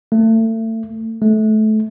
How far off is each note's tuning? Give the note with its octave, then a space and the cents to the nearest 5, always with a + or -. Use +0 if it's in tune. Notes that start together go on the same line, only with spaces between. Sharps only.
A3 +30
A3 -25